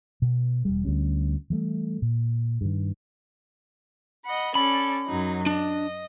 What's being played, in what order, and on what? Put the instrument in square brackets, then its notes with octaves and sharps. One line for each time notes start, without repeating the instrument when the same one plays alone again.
[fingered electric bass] B2
E1 G3
D2 G3 C#4
E3 G3 A3
A#2
G2 D#3
[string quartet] D#5 F#5 B5
[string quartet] C#4 A4 D5 [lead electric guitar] B5
[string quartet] F#2 F#3 D#4
[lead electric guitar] D4 [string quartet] D#5